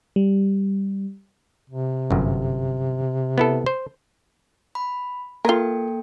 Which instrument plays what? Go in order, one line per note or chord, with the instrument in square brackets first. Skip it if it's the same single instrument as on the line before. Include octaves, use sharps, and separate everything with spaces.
[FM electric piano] G3
[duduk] C3
[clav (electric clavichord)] G1 F#2
B3 E4 A4
C5
[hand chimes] B5
[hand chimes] A#3 A4 G5 [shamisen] F4 A#4